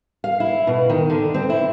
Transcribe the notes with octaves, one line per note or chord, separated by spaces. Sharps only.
F5
E4
B2
D#3
D3
C4
E4